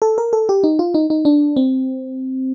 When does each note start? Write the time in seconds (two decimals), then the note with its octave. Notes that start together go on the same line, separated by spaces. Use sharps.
0.02 A4
0.18 A#4
0.33 A4
0.49 G4
0.64 D#4
0.79 F4
0.94 D#4
1.10 D#4
1.25 D4
1.57 C4